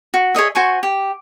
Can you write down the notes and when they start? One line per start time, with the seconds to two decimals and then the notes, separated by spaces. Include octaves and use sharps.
0.14 F#4
0.35 G#4 C#5 D#5 E5
0.55 F#4 C5 G#5 C#6
0.83 G4